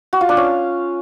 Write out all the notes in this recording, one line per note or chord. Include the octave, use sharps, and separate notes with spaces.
F#4
F4
D4
C#4